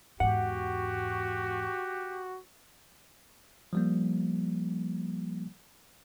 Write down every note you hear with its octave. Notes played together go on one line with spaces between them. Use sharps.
E2 G#2 F#4 G4 F#5
F3 G3 A#3